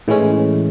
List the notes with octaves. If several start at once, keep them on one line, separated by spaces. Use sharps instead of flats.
A2 E3 G#3 C#4